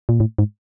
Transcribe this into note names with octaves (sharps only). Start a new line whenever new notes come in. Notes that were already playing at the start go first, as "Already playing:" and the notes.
A#2
A2
G#2